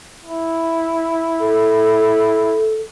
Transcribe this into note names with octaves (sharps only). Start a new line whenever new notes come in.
E4
A4